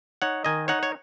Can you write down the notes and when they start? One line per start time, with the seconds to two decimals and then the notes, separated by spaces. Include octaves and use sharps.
0.22 D#4 C#5 F#5
0.45 D#3 D#5 G#5
0.68 D#4 C#5 F#5
0.83 C#5